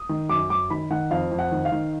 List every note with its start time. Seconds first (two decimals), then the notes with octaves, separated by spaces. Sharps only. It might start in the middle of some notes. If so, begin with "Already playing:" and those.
Already playing: D#6
0.09 D#3
0.29 F#2 D6
0.50 F#2 D6
0.70 D#3 B5
0.90 D#3 F#5
1.11 F2 F5
1.31 F2
1.39 F#5
1.52 D#3
1.65 F5
1.72 D#3